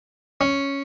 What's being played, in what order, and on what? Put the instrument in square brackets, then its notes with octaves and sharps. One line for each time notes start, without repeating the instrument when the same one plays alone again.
[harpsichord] C#4